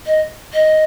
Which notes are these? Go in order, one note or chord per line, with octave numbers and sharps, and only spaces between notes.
D#5
D#5